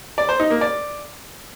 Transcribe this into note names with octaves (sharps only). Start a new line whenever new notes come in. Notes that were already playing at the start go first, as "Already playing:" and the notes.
D5
C5
D#4
A#3
D5